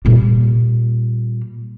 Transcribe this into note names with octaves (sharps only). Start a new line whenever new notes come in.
A#2 G3